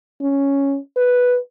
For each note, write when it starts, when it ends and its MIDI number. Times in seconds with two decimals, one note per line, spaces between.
0.21 0.77 61
0.96 1.37 71